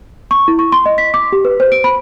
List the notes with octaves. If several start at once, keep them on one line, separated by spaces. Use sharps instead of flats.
C#6
E4
C#6
C6
D#5
B6
D6
G4
B4
C5
D7
B5